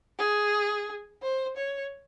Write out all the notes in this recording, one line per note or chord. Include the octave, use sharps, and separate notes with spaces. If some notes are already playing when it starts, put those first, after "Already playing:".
G#4
C5
C#5